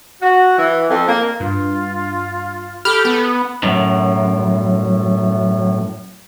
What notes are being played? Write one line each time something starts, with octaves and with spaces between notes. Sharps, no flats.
F#4
E3
F2
A#3
G2 F4
G4 A4 B5 F6
B3 B5
F#2 A2